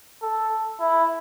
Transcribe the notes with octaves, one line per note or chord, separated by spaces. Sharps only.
A4
E4